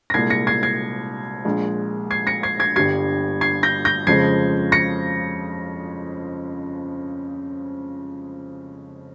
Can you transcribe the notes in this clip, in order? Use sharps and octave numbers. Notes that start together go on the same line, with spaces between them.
A#6
C2 A#2 G#3 G#6 C7
A#6 C#7
G#6 C7
G#6 C7
A#1 A#2 G#3
G#6 C7
A#6 C#7
G#6 C7
G#6 C7
G1 G2 G3 G#6 C7
G#6 C7
G6 A#6
G6 A#6
F2 C#3 F3 G#3 G#6 C7
A#6 C#7